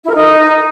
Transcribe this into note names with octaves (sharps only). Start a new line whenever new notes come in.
E4
A#4
D#4